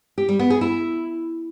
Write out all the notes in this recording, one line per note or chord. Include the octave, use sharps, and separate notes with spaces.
G4
G3
B3
G#4
E4